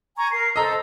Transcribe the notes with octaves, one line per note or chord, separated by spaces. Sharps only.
G#5 A#5 C#6
A#4 C7
A4 C5 D#5 A#5 E6